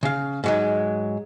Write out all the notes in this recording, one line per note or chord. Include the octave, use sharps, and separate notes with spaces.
C#3 F5
G#2 F#3 G#3